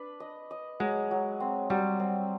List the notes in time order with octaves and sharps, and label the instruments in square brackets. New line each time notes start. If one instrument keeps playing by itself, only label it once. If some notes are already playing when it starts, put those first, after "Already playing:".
Already playing: [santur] D4 B4
D#5
D#5
[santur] F#3 [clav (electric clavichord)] G#3
[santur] F#3
C4
[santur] F#3 [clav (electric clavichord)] G3
[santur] C4